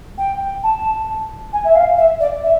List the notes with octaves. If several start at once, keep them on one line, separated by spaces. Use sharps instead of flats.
G5
A5
G#5
E5
F5
E5
D5
E5